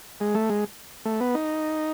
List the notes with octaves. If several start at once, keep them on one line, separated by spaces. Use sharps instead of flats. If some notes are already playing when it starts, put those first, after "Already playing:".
G#3
A3
G#3
A3
B3
D#4